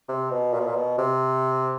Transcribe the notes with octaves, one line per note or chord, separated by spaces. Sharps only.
C3
B2
A#2
B2
A#2
B2
C3